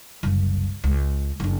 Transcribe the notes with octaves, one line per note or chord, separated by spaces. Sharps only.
F#1 C2
C#2
F#1 D4